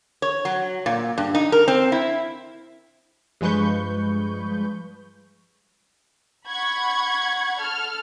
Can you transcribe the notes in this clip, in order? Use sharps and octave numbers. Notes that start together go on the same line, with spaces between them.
C#5
F#3
A#2
G2
D#4
A#4
C4
E4
G2 F3 G#3 B4 C#6 G6
F#5 B5 C#6 G#6
A4 F6